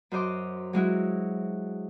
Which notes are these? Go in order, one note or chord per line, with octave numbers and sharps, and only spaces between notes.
F#2 F#4 C5 D#5 C6 D6
F#3 G#3 E4 F#4